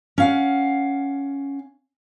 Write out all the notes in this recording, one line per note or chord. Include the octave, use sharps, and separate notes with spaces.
C#4 F5 F#5